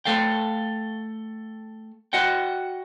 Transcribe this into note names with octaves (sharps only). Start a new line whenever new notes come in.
A3 A4 F5 G5
F#4 D#5 F#5 G5